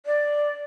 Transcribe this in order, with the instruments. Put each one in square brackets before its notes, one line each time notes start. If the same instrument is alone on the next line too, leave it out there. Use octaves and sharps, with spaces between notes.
[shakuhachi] D5